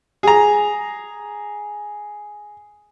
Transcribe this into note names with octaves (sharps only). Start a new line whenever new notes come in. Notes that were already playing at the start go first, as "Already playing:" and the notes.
G#4 A#5